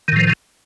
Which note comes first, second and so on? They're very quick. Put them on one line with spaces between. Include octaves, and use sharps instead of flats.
D#3 A2 F3